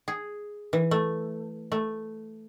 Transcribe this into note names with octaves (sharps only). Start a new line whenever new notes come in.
G#4
E3
A3
A3